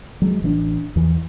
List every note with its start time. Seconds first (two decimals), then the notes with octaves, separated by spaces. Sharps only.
0.22 F#3 G#3
0.42 A1 E3 B3 D4
0.96 E2 E3